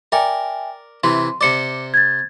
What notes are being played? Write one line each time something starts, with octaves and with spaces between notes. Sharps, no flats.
A#4 D5 E5 G5 G#5
C3 E3 C6
C3 C5 D5 D6 C#7
G#6 A6